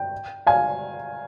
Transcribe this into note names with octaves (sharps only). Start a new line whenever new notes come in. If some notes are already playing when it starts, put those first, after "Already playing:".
Already playing: G5
F5 G#5